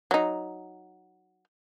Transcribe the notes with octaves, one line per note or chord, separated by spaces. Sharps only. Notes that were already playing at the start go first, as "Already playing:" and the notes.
F#3 D#4